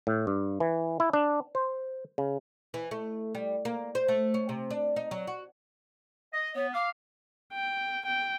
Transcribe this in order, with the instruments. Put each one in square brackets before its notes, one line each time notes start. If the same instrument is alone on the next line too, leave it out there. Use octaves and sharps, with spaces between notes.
[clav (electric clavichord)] A2
G2
E3
E4
D4
C5
C#3
[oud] E3
A3
G3
A#3
C5
A3
C#4
C3
D4
D#4
F#3
F#4
[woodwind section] D#5
[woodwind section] B3 [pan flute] C#5
[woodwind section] F5 [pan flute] D6
[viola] G5
G5